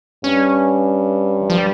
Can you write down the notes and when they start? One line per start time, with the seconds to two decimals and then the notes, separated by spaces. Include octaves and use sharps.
0.24 G2 C#4
1.41 E3
1.50 F3
1.58 G3